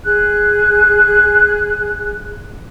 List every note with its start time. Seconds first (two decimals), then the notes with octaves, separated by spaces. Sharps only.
0.04 G#4 F#6